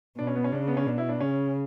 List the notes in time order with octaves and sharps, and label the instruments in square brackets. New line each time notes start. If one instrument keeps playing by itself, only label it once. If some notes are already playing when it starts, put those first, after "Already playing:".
[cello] B2 [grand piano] D4
[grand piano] C#4
B3
C#4
[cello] C#3 [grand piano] D4
[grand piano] B3
C#4
[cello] B2 [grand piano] D4
[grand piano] E4
D4
[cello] C#3 [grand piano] C#4